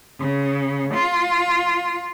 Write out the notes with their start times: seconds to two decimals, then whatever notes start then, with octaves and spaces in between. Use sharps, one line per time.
0.18 C#3
0.94 F4